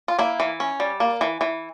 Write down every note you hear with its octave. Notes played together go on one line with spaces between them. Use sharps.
F4
A#3 E4
E3
C#4
G3
A#3
E3
E3